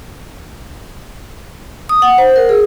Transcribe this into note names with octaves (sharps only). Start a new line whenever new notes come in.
D#6
F#5
C5
A#4
G#4